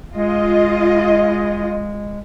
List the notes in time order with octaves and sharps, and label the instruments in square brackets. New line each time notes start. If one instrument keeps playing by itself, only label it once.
[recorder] G#3 [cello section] F4 D#5